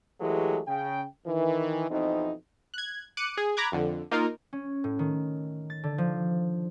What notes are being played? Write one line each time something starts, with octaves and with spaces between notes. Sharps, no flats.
E3 F#3 G#3 A3 G4 G#4
C#3 G5
D#3 E3
F2 B2 E3 C4 D#4
F#6 G#6
D6 F#6 C#7 D#7
G#4
A#5 B5 D6 F#6 G#6
F2 D3
A#3 D#4 F4 A#4
C#4
A2
D#3
A6
D3
F3